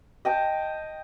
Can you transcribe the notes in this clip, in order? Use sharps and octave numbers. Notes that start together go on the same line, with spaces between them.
D#5 G5 A5